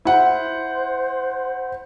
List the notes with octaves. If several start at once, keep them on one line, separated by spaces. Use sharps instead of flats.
E4 C5 F#5